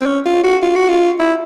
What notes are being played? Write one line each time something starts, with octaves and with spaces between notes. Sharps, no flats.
C4
C#4
F4
F#4
F4
F#4
F4
E4